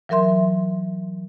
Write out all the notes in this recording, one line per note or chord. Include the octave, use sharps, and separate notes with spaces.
E3 F#3 A#4 E5 C6